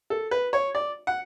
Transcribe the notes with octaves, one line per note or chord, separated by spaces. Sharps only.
A4
B4
C#5
D5
F#5